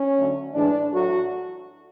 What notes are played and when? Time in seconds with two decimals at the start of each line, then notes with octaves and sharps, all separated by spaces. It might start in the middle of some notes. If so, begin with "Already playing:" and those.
Already playing: C#4
0.17 D3 F#3 A3
0.54 A2 E3 G#3 D4
0.91 A2 F#3 A3 F#4